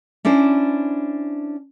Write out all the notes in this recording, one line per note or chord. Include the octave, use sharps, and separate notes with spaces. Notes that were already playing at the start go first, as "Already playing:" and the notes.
C#4 D4 E4 C5